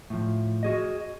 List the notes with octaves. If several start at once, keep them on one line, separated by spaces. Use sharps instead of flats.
A2 F3
F#4 G#4 D#5